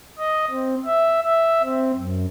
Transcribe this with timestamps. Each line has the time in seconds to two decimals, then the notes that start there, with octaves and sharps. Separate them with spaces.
0.19 D#5
0.51 C4
0.85 E5
1.24 E5
1.63 C4
1.96 F#2